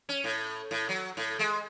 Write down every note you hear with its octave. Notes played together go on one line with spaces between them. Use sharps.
C#4
A2
A2
F#3
A2
G#3